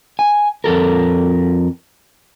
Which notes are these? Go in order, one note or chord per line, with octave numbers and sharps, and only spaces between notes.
G#5
F2 A4 A#4